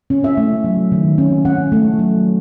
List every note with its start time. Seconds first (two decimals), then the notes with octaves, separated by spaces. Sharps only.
0.10 C#4
0.24 E5
0.37 A3
0.64 F#3
0.92 D#3
1.18 C#4
1.45 C#4 F#5
1.72 A3
1.99 F#3